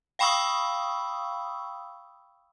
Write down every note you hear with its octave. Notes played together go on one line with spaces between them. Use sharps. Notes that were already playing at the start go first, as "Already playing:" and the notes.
F5 G5 B5 C#6 D#6 E6